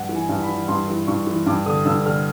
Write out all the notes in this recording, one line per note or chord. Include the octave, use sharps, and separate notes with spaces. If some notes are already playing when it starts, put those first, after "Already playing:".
Already playing: G2 F#5
E3
G#5
G2
B5
E3
G2 C6
E3
G2 C#6
E3
G2 D6
D3 D#6
G2 E6
D3 F6